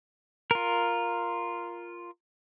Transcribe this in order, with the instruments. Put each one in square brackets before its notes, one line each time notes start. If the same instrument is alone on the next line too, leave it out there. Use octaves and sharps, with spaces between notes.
[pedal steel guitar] F4 A#4